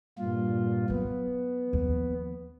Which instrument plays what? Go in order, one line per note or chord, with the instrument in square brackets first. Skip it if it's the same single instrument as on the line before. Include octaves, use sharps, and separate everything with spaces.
[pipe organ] G2 A#2 F4
[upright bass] F#3 [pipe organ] B3
[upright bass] D#2 F3